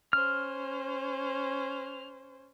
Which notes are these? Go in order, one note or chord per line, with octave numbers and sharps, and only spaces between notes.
C#4 C5 F6